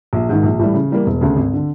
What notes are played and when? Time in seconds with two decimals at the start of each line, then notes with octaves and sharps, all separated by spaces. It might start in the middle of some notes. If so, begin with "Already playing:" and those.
0.13 A#1
0.29 G#2 D#3
0.43 A#1
0.59 A2 E3 G3
0.74 C#3
0.91 E3 G3 A#3
1.06 E1
1.21 D2 C#3
1.36 G#1
1.53 D3